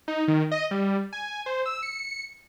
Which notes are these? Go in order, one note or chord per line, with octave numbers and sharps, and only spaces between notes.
D#4
D#3
D#5
G3
G#5
C5
E6
C#7